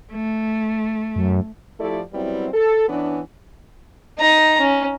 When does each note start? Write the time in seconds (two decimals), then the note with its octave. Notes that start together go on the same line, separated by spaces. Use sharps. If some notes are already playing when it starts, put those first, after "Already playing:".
0.12 A3
1.16 F#2
1.79 F3 A3 E4 G4 A4 D5
2.13 F#3 G3 B3 C4 E4
2.54 A4
2.88 E3 B3 C#4 D4
4.19 D#4 A#5
4.61 C#4